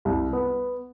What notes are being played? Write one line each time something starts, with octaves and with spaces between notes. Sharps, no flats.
C2
B3